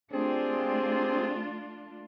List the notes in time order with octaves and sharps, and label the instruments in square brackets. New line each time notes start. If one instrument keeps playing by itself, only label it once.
[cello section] A3 D4 F4 [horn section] C4 G4 G#4